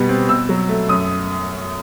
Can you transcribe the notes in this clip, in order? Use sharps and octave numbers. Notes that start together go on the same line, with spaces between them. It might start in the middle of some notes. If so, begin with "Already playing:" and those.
Already playing: B2 G3 B3
C4
B2 E6
F#3
A3
F#2 D#6